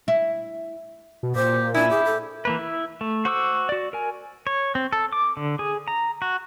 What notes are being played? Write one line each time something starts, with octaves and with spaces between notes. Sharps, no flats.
E4
B2
A#2 G4 C5
D4 E4 G#5
G4 G#4
A4
E3 A#3 B4
E4
A3
F#4 C5 C#6 D6 E6
F#4 D5
A#4 G#5
C#5
C4
A4
D6
D3
G#4
A#5
F#4